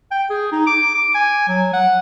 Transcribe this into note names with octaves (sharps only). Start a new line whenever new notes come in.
G5
G#4
D#4
D6
D6
G#5
F#3
F#5